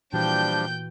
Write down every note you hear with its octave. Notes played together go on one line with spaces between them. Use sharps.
A#2 E3 F3 G3 D4 F#4 G5 G6